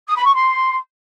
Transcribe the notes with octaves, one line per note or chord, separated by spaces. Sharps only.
D#6
B5
C#6
C6